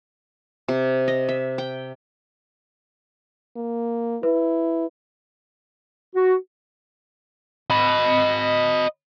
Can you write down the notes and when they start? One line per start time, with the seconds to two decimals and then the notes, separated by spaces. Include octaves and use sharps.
0.68 C3
1.08 D#5
1.29 E5
1.58 G5
3.56 A#3
4.23 E4 B4
6.16 F#4
7.70 D#5 B5